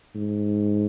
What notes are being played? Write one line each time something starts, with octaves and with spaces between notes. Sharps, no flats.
G#2